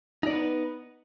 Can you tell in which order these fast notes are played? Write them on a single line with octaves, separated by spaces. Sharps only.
D#4 D5 B3 B4